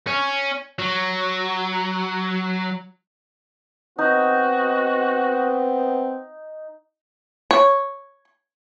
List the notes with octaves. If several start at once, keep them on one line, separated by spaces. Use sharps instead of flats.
C#4
F#3
B3 C4 D#4 F#4
C#5